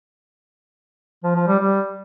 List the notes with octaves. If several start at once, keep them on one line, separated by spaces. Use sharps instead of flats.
F3
F3
G3
G3